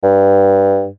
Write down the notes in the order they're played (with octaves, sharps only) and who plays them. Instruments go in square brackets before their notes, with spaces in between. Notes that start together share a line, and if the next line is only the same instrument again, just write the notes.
[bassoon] G2